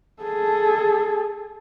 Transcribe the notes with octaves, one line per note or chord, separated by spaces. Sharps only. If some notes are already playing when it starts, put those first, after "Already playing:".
G#4 A4